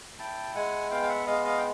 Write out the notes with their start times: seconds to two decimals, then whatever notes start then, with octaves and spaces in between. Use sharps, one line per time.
0.19 E4 G5 A5
0.55 G#3 F#5 G#5
0.90 B3 F5 G5
1.02 F5
1.09 E5 F#5
1.27 G#3 D#5 F5
1.44 D#5 F5
1.58 G5